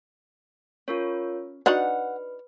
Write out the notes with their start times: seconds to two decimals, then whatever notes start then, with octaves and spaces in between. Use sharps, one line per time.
0.88 C#4 F4 A#4 C#5
1.66 D4 D#4 F#4 B4 F#5